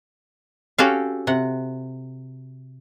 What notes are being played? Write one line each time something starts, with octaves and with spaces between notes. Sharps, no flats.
C#4 F#4 G4 A4 F5
C3 F#5